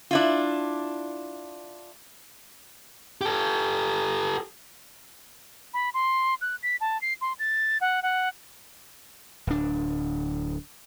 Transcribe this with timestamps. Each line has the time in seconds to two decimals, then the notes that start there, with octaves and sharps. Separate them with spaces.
0.11 D4 E4 F4
3.21 G4 A4
5.74 B5
5.94 C6
6.41 F#6
6.63 B6
6.81 A5
7.01 C7
7.21 C6
7.39 A6
7.81 F#5
8.03 F#5
9.47 D1 D4